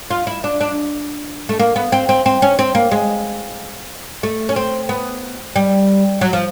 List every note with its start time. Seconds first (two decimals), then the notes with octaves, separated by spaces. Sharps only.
0.10 F4
0.27 E4
0.44 D4
0.61 D4
1.49 A3
1.59 A#3
1.76 B3
1.92 C4
2.09 C4
2.26 C4
2.42 C#4
2.59 C4
2.75 A#3
2.91 G#3
4.23 A3
4.49 C#4
4.56 C4
4.89 B3
5.56 G3
6.21 F#3
6.33 F3